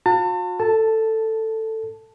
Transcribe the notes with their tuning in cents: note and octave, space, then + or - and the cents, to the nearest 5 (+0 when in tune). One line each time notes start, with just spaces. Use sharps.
F#4 -45 A5 +40
A4 +10 A5 +0